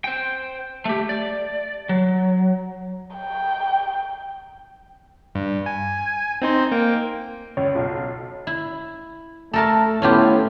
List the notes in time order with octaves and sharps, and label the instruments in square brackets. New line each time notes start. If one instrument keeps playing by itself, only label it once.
[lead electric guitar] C5 G5
A3 G4
D5
F#3
[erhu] G5
[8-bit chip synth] G2
G#5
C4 D#4 C5
A#3 G5
[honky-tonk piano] C#2 [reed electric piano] C#5
[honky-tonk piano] B1 F4
[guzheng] E4
[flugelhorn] A3 [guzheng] A4 A#4 A5
[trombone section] A2 [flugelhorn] B3 [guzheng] C#4 F4 G4